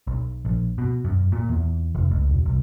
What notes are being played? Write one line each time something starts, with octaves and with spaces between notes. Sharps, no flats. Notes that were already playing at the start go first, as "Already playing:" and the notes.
B1
A#1
B2
F#2
A#2
E2
F1
C#2
E1
C2